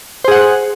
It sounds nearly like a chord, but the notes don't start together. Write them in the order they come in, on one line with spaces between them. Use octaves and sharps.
C5 G#4 F#5